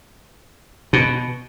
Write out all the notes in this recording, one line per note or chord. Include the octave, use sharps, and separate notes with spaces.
B2